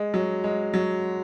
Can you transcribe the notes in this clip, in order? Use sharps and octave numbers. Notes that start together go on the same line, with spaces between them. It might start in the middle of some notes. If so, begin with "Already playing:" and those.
Already playing: G#3
F#3
G#3
F#3